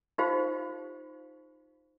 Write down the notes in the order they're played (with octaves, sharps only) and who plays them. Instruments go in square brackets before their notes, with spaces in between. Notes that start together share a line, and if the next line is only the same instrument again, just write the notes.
[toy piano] D#4 F4 G4 C5 F5